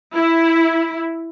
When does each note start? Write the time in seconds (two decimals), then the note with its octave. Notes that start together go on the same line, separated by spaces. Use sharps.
0.14 E4